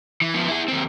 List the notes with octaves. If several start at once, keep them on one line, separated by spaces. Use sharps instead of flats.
E3
F3 B3
E4 G#4
D#2 C4